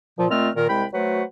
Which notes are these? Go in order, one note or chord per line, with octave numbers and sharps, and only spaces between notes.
A#2 F3
A#2 A3 C4 F4 D#5 F6
A#2 D#3 A#4
C2 G#3 G5 B5
F#3 A3 F#4 B4 C5 F#5